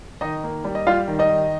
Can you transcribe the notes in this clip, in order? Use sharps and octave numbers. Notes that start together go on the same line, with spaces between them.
D#3 D#4 D#5
A#3
G3
D#5
G3 F4 F5
D#3
D#4 D#5
D#3